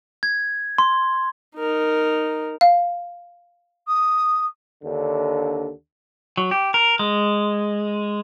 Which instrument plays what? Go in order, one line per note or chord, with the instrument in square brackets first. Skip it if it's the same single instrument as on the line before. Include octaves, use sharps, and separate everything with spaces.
[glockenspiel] G#6
C6
[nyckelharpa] D#4 A#4
[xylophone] F5
[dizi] D#6
[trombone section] D#2 D3
[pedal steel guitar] F#3
G4
A#4
G#3